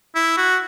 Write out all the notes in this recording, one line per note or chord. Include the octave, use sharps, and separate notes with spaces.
E4
F#4